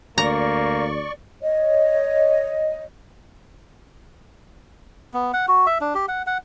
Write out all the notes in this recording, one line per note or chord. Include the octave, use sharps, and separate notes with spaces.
D2 A#3 D5 A#5 C#6
C#5 D#5
B3
F#5
F#4
E5
D4
G4
F#5
F#5